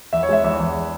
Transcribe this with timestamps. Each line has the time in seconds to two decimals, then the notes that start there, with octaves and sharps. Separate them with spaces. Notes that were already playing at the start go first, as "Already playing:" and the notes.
0.13 E2 E5
0.23 C#5
0.29 G#3 E5
0.44 E2 E5
0.59 E2